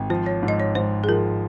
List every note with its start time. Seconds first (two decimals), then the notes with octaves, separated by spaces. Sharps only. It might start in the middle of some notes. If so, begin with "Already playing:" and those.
Already playing: G#1
0.10 F3 C5
0.26 C#5
0.43 G#2
0.48 D#5
0.60 C#5
0.75 G#2 C5
1.04 G#4
1.08 F3 A#4